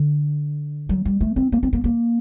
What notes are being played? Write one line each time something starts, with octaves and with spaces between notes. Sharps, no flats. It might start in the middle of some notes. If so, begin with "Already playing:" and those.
Already playing: D3
F#3
G3
A3
C4
A#3
C4
A#3
A#3